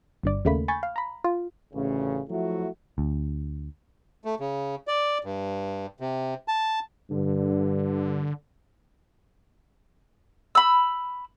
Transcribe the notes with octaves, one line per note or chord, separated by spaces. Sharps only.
G1 G2 D5
D#2 C#3 A3 A#3 B5
G#5 B5 C#6 G6 A6
F5
A#5 B5
F4
A1 D2 C#3
F3 F#3 A3 E4 F#4
D2
A3
C#3
D5
G2
C3
A5
G2 D3
B5 E6